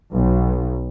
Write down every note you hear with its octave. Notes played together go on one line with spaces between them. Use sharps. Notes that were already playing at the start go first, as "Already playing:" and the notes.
B1